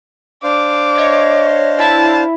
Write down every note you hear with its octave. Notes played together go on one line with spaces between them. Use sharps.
D4 C5 F5 D6
C#5 D#5
E4 A5